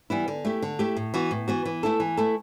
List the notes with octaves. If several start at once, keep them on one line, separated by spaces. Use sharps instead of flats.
E3 G3 B3 E4
D3
A3 E4 G4
D3
A3 E4 G4
A2
E3 B3 F#4
A2
E3 B3 F#4
E3
A3 E4 A4
E3
A3 E4 A4